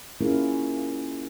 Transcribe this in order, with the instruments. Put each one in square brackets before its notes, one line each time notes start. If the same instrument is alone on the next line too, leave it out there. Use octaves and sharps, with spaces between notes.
[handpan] A#3 C#4 E4 F4 G#4 A#4